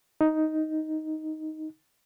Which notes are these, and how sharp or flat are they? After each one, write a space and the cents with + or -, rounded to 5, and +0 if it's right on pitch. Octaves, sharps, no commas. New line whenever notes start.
D#4 +5